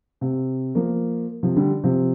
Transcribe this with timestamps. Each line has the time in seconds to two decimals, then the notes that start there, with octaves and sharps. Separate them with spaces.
0.21 C3
0.75 F3 A#3
1.43 C3 F3
1.56 D3 G3
1.84 C3 F3